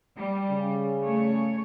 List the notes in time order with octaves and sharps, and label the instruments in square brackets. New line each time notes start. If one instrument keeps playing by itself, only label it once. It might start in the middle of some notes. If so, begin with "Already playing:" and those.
[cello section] G3
[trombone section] C#3
[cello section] A3 C#5